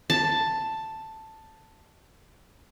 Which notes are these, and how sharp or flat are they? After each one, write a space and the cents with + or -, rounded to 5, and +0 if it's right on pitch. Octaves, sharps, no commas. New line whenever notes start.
A5 +5